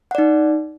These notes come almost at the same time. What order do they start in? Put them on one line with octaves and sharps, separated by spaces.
F#5 D5 D#4